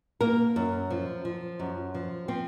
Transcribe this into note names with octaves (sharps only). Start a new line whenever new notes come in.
A#3 A#4
F#2
F3
F3
F#2
F3
F3 C4